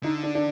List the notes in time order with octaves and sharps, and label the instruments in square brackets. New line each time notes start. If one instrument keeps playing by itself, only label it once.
[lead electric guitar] D3 [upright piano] D#4
[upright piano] D4
D4